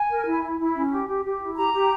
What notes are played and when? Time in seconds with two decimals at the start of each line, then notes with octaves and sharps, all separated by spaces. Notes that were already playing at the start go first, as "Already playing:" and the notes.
Already playing: G#5
0.09 A#4
0.26 E4
0.43 E4
0.59 E4
0.75 C#4
0.91 G4
1.08 G4
1.24 G4
1.40 E4
1.56 G4 A#5
1.72 G4